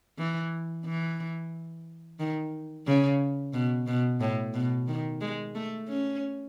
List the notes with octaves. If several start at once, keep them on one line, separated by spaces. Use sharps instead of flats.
E3
E3
D#3
C#3
B2
B2
A2
B2
D#3
G#3
A3
C#4